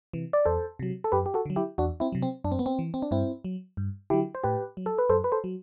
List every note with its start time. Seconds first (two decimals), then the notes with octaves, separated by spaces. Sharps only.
0.13 C3 E3
0.33 D5
0.46 E2 A4 C5
0.79 C3 F#3
1.04 A4
1.12 F#2 G4 B4
1.26 G4
1.34 F#4 A4
1.46 D3 F#3
1.56 E4 G4
1.78 E2 D4 F#4
2.00 C4 E4
2.12 C3 F#3
2.22 C4
2.44 F#2 D4
2.52 C4
2.59 B3
2.66 C4
2.79 E3
2.94 C4
3.02 D4
3.11 G2 C4 E4
3.44 F#3
3.77 G2
4.10 D3 F#3 E4 G4
4.35 C5
4.44 A2 G4 B4
4.77 F#3
4.86 A4
4.98 B4
5.10 F#2 A4 C5
5.24 B4
5.32 A4 C5
5.44 F#3